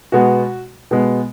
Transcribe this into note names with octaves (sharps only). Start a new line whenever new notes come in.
B2 G#3 B3 F#4
B2 G#3 B3